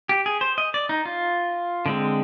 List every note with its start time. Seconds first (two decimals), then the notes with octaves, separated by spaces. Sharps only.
0.09 G4
0.26 G#4
0.41 C5
0.58 D#5
0.74 D5
0.89 D#4
1.06 F4
1.86 D3 G#3 C4